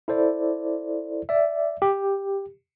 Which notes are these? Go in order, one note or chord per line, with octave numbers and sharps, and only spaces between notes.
E4 A4 C5 D5
D5 E5
G4